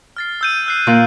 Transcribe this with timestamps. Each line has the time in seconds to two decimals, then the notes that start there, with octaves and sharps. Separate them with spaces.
0.17 F6 A6 C7
0.41 E6 G6 D#7
0.66 E6 F#6 C7
0.87 A#2